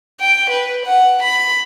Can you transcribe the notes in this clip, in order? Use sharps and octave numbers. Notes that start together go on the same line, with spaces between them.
G5
B4
F#5
B5